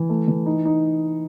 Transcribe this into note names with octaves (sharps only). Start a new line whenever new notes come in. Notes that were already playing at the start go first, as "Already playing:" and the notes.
Already playing: E3
A3
E3
D#4
D#4